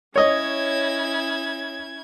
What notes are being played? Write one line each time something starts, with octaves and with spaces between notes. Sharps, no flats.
C#4 E4 C#5 D#5 G#6